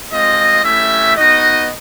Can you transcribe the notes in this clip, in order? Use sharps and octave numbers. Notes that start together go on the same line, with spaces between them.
G#3 C4 F4 D#5
A3 C#4 E4 G4 E5
B3 D#4 F#4 D#5